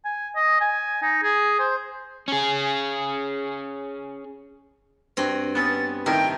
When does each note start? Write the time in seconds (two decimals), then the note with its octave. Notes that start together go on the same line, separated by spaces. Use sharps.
0.05 G#5
0.36 D#5
0.61 G#5
1.03 D#4
1.23 G#4
1.59 C5
2.28 C#4 G#4
5.17 G2 C4 F#4
5.55 B3 C#4 D#6 A6
6.06 A2 C3 D#3 A#4 G5